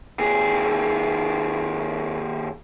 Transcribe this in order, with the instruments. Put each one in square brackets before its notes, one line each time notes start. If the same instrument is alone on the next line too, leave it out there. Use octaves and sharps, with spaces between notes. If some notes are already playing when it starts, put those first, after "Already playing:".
[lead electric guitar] D#2 G#4